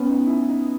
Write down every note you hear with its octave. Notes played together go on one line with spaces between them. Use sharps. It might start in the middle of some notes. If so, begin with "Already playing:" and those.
Already playing: B3 C#4
D#4
E4
D#4